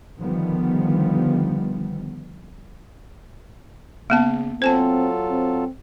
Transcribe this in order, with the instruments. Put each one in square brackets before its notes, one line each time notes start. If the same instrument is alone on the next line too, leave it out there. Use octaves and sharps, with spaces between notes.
[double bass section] D3 D#3 F3 G3 B3
[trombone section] C#3 [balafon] A#3 B3 A5
[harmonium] F#3 F4 A4 [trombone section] C4 [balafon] C5 G#5 A5
[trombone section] C4